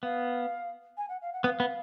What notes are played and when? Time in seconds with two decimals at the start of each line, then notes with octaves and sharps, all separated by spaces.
0.03 B3 F5
0.97 G#5
1.09 F#5
1.21 F5
1.33 F#5
1.44 B3 F5
1.60 B3